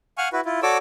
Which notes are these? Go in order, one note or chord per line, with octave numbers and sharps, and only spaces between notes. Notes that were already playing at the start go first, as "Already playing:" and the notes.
F5 F#5 G#5 C#6 F6
E4 F#4 B4
E4 F4
F#4 A4 C#5 D5 D6 E6